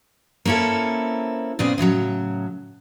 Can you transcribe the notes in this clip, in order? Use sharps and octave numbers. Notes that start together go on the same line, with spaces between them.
A#3 C4 C#4 E4 A4
A#2 C#3 B3 C4 G#4
A2 C#3 F3 F#3